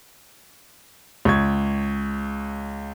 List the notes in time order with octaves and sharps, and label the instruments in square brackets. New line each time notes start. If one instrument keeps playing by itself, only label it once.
[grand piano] C#2 C#6 G#6